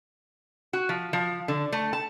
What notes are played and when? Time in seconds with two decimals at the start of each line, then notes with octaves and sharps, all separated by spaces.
0.73 F#4
0.89 F3
1.13 F3
1.48 D3
1.72 A3
1.93 A5